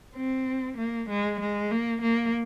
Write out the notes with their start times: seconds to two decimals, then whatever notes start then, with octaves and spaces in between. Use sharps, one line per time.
0.16 C4
0.77 A#3
1.09 G#3
1.40 G#3
1.71 A#3
2.02 A#3